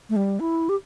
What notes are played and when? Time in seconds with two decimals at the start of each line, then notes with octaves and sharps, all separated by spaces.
0.10 A3
0.16 G3
0.40 E4
0.69 G4